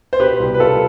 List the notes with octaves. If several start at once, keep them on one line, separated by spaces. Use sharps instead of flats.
C5
B2 G4 B4
C2
B4
C2 F4 A4